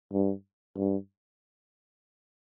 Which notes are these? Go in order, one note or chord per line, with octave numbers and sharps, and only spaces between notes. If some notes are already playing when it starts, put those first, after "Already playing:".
G2
G2